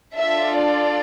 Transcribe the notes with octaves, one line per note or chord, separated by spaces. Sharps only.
D4 F4 A4 E5
D5